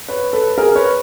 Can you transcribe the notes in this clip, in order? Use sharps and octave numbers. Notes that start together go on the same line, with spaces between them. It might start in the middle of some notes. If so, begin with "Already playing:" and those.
B4 C#5
A4 B4
G#4 A#4
B4 C#5